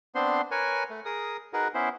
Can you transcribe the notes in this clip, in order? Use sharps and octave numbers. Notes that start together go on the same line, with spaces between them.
B3 C4 D4 C5 C6
A#4 B4 C#5 G#5
A3
G#4 A#4 D#6
D#4 F#4 G#4 A#4 B4
B3 C#4 E4 C5